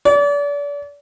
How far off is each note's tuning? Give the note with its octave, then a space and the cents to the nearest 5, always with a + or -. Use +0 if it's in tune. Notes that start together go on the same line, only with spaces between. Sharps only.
D5 -35